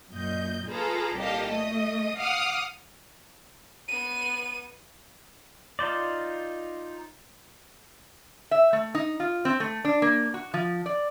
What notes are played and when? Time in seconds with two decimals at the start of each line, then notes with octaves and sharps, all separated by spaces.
0.11 F#2 A#2 D#5 G6
0.67 F4 G#4 A4 B4 A#5
1.16 C2 A#2 G4 A4 D#5 F5
1.51 A3 D#5 D#6
2.19 F5 F#5 D6 D#6 F6
3.88 B3 D#7
5.79 D#4 F4 C5 D5
8.51 E5
8.73 A3
8.95 D#4
9.20 F4
9.45 C4
9.60 A3
9.85 D4
10.02 A#3
10.34 F#4
10.54 F3
10.86 D5